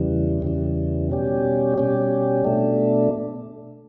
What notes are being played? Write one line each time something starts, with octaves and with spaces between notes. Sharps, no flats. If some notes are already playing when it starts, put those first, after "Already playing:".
Already playing: E2 C#3 E3 G3
E2 C#3 E3 G3
B2 G3 C#4 G4
B2 G3 C#4 G4
B2 A3 D4